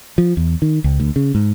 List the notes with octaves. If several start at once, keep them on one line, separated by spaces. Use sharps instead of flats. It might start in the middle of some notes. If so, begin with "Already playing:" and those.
F3
E2
D#3
C#2
D2
C#3
G#2